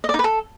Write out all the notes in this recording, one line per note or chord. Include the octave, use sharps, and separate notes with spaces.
D#5
D5
D#4
B4
A4